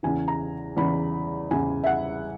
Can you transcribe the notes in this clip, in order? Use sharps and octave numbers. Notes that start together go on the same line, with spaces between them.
E2 C#3 E3 G#5
A#5
E2 C#3 E3 B5
E2 C#3 E3 G#5
E5
F#5